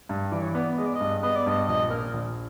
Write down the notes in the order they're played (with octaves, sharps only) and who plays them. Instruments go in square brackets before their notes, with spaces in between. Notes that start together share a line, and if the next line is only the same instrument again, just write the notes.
[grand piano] G2
[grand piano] E3 [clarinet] D5
[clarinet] C#5
[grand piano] B3 [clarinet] D5
[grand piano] G#3 [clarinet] D#5
[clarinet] D5
D#5
[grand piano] G2
[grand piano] B3 [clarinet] D#5
[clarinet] D5
[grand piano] G2 [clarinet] D#5
[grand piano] A#1 [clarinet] D#5
[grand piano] A#2 [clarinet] A#4
[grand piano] A#1